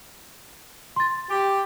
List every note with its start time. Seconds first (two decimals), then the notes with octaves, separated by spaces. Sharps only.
0.96 C6 A6
1.29 G4